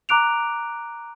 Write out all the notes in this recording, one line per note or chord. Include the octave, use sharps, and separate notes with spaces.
A#5 D6 F#6 D7 F7